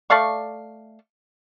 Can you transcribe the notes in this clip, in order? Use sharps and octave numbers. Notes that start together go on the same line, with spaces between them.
A3 D5 F5 C#6